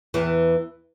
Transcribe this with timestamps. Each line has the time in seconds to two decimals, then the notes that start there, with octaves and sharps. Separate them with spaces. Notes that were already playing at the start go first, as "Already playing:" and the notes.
0.14 E2 E3